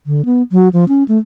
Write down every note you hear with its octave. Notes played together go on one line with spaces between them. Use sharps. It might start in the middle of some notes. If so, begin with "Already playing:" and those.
D3
B3
F#3
F3
C#4
A3